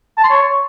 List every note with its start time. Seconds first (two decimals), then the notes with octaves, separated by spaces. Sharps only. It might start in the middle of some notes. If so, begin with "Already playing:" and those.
0.18 A5
0.24 C6
0.30 C#5